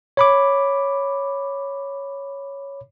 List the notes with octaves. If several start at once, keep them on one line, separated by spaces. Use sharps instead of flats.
C#5 B5 D6